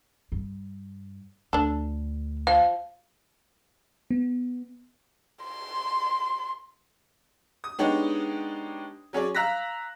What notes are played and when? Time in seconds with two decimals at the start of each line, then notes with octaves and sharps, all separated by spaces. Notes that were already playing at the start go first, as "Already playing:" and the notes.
0.32 G2
1.53 D2 D4 A4
2.47 F3 F5
4.11 B3
5.44 C6
7.64 D#6
7.79 G#3 B3 D4 D#4 G4 C#5
9.13 F#3 C#4 G#4 D5
9.35 F5 A#5 E6 F#6 A#6 B6